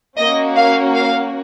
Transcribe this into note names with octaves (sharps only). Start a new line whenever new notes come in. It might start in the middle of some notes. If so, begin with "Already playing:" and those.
A#3 C#4 F#4 D#5
F5
F5